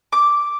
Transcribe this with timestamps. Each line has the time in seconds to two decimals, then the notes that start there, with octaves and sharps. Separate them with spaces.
0.12 D6